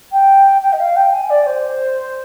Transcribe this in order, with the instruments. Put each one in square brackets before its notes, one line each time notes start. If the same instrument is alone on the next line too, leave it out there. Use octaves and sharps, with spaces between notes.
[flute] G5
G5
D#5
F5
G5
G#5
D5
C5